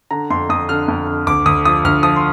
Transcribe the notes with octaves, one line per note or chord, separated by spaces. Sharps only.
D3 A#5
F2 C6
F2 D#6
D3 F6
F2
D3
D2 D6
D2 D#6
F3 D#6
D2 F6
F3 D#6
C6